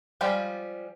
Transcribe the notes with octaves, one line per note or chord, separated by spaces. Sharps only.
F3 G3 G#3 F4 G4